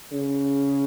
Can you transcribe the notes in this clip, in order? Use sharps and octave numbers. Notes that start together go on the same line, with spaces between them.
C#3